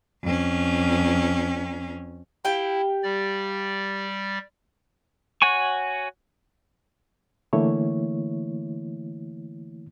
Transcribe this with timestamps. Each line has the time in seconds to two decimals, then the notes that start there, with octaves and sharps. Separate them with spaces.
0.23 F2 C#4
2.45 E4 G4 F5 G5
3.03 G3 D5
5.42 F#4 C#5 F#5 G#5 C#6
7.53 D3 E3 A3 A#3 E4 C#5